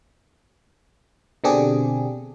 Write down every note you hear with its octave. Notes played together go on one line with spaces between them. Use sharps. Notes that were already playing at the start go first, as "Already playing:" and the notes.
B2 D3 C4 D4 G4 G#4